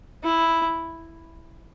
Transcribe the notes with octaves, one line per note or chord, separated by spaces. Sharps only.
E4